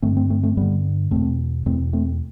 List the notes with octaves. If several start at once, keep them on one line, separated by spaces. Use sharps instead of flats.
G2 D3 A3 C4
A3 C4
A3 C4
A3 C4
G2 D3 G3 B3
E2 B2 A3 C4
E2 B2 A3 C4
A3 C4